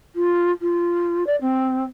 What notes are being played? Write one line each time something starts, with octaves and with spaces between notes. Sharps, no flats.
F4
F4
D5
C4